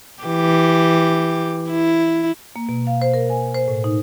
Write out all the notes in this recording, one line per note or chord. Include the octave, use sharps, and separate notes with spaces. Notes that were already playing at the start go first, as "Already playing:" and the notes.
E3 G4
E4
A#3
B2
F5
C5
A#4
G#5
C5
A2
D#4